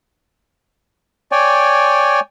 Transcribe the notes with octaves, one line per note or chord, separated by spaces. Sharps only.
C#5 D5 G5 G#5